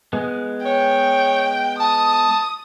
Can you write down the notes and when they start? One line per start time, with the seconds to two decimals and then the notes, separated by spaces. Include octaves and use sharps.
0.13 G#3 B3
0.65 C#5 G5
1.80 A5 D#6